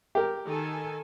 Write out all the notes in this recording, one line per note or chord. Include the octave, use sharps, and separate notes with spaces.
G4 A#4
D#3 A4 G#5